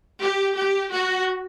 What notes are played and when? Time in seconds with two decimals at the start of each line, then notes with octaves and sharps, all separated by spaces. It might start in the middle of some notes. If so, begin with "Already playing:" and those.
0.19 G4
0.54 G4
0.90 F#4